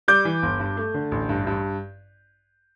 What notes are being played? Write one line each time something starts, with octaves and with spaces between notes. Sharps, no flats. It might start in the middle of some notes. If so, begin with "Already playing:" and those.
G3 D6 G6
E3
G1
G2
A3
D3
A1
G2
G2